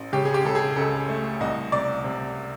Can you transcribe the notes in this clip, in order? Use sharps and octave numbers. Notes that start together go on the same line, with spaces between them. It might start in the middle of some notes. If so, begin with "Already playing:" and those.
Already playing: A1
C#3 G4
G#4
G4
C#3 A4
G#4
C#2 A4
A3
C2 D#5
C3 D5
C3